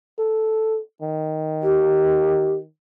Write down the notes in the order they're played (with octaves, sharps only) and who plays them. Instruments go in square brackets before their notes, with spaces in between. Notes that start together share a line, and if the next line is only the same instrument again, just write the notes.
[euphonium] A4
D#3
[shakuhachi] G4